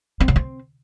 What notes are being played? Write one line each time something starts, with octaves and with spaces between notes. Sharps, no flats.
C4
C#3
C4